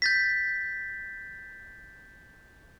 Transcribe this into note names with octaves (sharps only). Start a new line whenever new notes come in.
G6 A6 B6